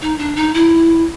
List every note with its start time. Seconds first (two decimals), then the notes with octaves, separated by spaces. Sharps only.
0.01 D#4
0.18 D4
0.36 D#4
0.54 E4